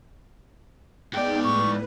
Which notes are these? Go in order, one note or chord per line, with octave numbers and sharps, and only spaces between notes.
G#2 B3 D#4 G#4 D5 G5
A2 B4 C#6